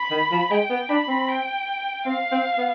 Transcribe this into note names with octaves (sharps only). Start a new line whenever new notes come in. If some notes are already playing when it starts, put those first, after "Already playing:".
Already playing: B5
D#3
F3
G#3 G5
B3
D4 B5
C4
G5
C4 F5
C4
B3